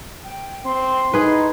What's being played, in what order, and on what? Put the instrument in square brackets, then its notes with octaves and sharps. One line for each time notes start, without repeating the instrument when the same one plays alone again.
[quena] G5
[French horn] C4 [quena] C6
[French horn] A2 [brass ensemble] D#4 [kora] G#4 B4